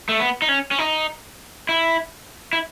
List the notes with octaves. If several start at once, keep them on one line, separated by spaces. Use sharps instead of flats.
A3
B3
D#4
C#4
C#4
D#4
E4
E4